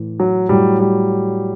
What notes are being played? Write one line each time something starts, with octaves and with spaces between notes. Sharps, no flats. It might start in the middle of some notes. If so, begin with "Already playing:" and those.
Already playing: A2 E3
F#3
A2 F#3 G3
G3